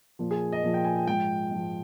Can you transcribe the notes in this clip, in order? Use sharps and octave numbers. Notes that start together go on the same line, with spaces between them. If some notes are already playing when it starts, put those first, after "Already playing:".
A#2 F3
G#4
D#5
A#2 F3
G5
G#5
G5
G#2 F3 G5
G#2 F3